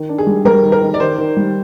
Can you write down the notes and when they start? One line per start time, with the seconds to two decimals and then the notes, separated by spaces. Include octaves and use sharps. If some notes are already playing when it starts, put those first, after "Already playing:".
Already playing: D#3
0.09 D4
0.18 G#4
0.27 G3
0.45 G3 A#4
0.63 D#3
0.72 A#4
0.81 D#3
0.94 D5
1.00 D#3 C5
1.18 D#3
1.37 G3